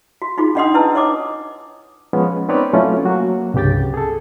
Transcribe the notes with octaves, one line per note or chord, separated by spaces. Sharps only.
F#4
D#4 F4 F#4 G#4
C#4 D4 D#5 F#5 C6 D#6
D4 E4 B4 A5 E6
C#5 D#5 D6 D#6
F3 G#3 B3 C#4
C4 C#4 D#4 B4 C#5 D5
F#3 A3 C#4 E4 F4
F#3 A#3 F#4
C2 G2 C#3 G4 G5 A6
G#4 A4